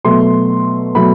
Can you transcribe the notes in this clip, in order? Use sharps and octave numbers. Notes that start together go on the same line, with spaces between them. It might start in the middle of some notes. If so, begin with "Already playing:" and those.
B2 F#3 A3 C6
B2 F#3 A3 B5